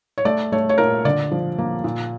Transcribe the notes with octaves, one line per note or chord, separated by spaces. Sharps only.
C#5
A3 D5
A3 C#5
C#5
A#2 A#4
D3 D5
F3
A#3
A#2